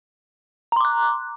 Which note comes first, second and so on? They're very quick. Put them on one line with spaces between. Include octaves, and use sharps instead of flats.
A#5 C6 D6 F#6